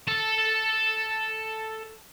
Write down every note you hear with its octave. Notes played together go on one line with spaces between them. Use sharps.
A4 A5